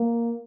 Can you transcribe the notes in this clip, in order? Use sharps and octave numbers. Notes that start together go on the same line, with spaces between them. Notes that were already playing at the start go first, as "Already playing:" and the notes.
Already playing: A#3